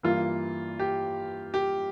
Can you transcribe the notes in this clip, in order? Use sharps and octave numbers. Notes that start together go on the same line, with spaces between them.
G2 E3 A#3 F4
G4
G4